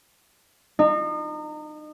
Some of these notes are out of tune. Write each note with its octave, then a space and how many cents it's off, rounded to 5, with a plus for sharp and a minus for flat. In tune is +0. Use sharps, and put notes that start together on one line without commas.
D#4 -35